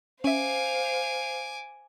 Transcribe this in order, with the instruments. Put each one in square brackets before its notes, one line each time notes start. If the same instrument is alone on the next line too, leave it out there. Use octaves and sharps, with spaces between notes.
[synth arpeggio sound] C#4 E5 [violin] C5 F5 [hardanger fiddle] G#5 D6